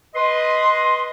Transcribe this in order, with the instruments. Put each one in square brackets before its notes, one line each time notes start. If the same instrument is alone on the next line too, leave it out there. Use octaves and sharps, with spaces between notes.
[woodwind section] B4 D#5 C6